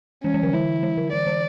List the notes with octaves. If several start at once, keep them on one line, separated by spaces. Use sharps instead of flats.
E3 C#4
E3
D3
E3 E4
E3
D3
E3 D5
E3